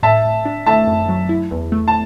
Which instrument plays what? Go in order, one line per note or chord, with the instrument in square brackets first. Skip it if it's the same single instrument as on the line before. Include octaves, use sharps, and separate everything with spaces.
[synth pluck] A2 [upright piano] E5 A5
[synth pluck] A2
D4
[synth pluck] A3 [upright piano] E5 A5
[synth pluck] F#2
F#3
E4
E2
A3
[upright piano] A5